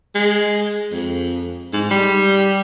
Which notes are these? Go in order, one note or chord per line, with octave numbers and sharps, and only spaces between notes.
G#3
F2
G#2
G3